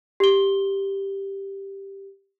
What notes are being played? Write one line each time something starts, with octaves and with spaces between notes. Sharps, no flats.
G4 G7